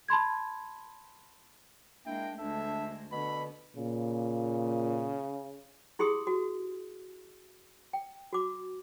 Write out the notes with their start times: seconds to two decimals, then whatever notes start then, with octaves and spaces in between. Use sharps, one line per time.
0.08 A5 B5 C6 G#6
2.06 G#3 A#3 D4 E4 G5
2.39 D2 G#3 D4 A4 E5
3.12 B2 D3 B3 B5
3.76 A#2 C#3
5.99 E4 G4 G#4 C6 D#6
6.27 F#4
7.93 G5
8.33 F#4 D6